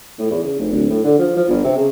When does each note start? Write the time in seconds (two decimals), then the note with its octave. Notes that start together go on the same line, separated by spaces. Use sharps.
0.19 A2
0.30 E2
0.43 C#3
0.59 F1
0.72 D1
0.89 A2
1.04 D3
1.19 F3
1.36 F3
1.49 G1
1.64 C3
1.77 C#3